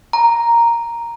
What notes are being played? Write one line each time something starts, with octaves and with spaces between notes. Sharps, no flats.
A#5